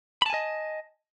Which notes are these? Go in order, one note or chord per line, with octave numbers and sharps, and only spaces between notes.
D#5 G#5 A5 B5